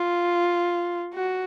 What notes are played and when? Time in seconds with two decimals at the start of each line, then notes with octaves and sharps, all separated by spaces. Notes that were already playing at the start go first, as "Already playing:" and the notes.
Already playing: F4
1.15 F#4